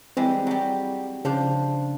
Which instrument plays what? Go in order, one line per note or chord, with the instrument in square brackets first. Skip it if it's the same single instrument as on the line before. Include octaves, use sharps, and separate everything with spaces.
[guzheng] E3 G3 G#3 [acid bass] C4
[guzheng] F#3 G3
[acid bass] C#3 [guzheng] F3 D4 C5